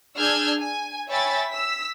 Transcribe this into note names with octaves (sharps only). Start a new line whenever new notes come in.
D4 G#4 E6 F6 G6 G#6
G#5
C#5 E5 G5 G#5 B5 A6
E6 B6